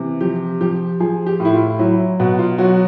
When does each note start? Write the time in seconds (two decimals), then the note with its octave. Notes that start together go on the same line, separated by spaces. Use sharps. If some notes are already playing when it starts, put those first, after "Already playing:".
Already playing: C3 E3
0.21 F3 G4
0.61 F3 G4
1.00 F3 G#4
1.27 G4
1.40 A2
1.45 E4
1.53 F4
1.79 F#3 E4
2.20 B2 F#4
2.39 F4
2.58 F#3 F#4